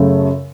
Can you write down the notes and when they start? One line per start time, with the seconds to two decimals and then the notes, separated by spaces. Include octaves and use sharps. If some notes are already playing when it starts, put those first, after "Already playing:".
Already playing: F#2 C#3 A3